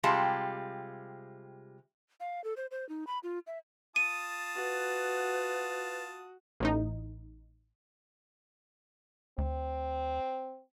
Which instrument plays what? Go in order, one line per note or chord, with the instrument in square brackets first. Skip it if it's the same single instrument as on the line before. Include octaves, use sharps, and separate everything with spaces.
[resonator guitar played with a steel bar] C3 G3 G#3 F4 G4 A5
[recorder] F5
A4
C5
C5
D#4
B5
F4
E5
[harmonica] F4 A5 D#6 [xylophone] D#7
[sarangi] F#4 [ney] B4
[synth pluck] A1 A2 D#4
[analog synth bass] D2 [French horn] C4